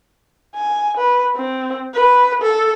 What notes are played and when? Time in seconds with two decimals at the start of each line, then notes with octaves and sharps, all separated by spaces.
0.55 G#5
0.97 B4
1.36 C4
1.94 B4
2.42 A4